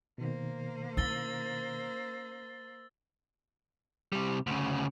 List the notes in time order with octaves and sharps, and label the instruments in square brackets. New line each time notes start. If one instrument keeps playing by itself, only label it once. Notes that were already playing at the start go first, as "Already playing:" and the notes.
[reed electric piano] B2 D#3 [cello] A#3 C5
[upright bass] C#4 E4 [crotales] E6 A6 G7
[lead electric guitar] C3 G3
D2 C#3